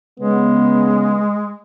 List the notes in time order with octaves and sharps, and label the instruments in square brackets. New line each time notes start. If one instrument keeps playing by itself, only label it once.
[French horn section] C#3 B3 [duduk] G#3